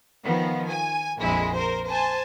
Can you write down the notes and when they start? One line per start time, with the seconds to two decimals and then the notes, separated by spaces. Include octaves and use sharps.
0.23 D#3 F3 B3
0.69 G#5
1.19 A#1 F2 G#3 E4
1.55 A#4 C5
1.88 C5 G#5 A5